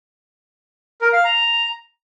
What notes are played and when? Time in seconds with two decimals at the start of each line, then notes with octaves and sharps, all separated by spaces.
1.01 A#4
1.13 F5
1.24 A#5